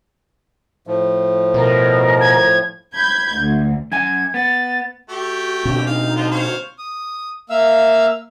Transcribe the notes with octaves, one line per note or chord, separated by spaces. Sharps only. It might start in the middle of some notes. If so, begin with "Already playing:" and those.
A2 F3
B2 A#4
G#6
B5 G6 G#6
D2
F#2 G#5 G#6
B3 A6
A3 F#4 G4
B2 C4 D4
D#4 F5
D3 F3 F4
C5 C#5 F5
D#6
A#3 E5 F5 E6